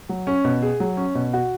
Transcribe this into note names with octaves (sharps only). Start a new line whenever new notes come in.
F#3
C#4
B2
G#4
F#3
C#4
B2
F#4